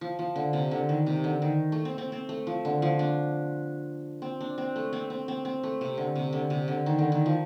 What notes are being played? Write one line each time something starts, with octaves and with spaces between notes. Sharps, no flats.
F3
F3
D3
C3
D3
D#3
C3
D3
D#3
A3
C4
C4
C4
A3
F3
D3
F3
D4
C4
D4
C4
A3
C4
C4
C4
C4
A3
C3
D3
C3
D3
C3
D3
D#3
D3
D#3
F3